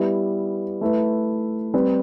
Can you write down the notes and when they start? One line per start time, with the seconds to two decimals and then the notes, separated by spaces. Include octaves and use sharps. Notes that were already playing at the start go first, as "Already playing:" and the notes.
Already playing: G3 B3 E4 B4
0.81 A3 E4 B4
1.74 G3 C4 G4 B4